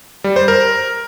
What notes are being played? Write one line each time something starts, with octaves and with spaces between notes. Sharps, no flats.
G3
C5
A#4